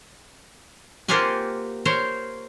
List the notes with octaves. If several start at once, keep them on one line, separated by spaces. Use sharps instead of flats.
A#3 C4 F4 G4 F#5 G#5
A#4 C5 C#5